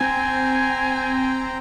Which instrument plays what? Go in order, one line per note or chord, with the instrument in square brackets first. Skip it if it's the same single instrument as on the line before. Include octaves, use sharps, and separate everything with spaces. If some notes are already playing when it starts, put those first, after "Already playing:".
[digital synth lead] C4 [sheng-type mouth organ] C5 G5 A#5 [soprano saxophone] G#5